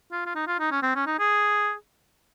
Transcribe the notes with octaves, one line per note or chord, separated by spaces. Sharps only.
F4
F4
D#4
F4
D#4
C#4
C4
C#4
D#4
G#4